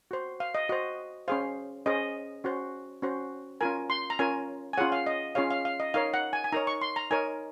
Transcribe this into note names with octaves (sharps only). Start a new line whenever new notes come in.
F#4 C5
F5
D#5
F#4 C5 D#5
C#4 G#4 C5 F5
C#4 G#4 C5 D#5
C#4 F#4 C5
C#4 F#4 C5
C#4 F4 A#4 G#5
C6
A#5
C#4 F4 A#4 G#5
G#5
C#4 F4 G#4 C#5 F#5
F5
D#5
C#4 F4 G#4 C#5 F5
F5
F5
D#5
D#4 A#4 C#5 F5
F#5
G#5
G#5
D#4 A#4 C#5 A#5
C#6
C6
A#5
D#4 A#4 C#5 G#5